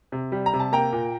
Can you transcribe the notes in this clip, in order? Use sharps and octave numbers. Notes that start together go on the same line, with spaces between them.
C3
G3
A#5
C3
A5
A#3 G5 A#5
A#2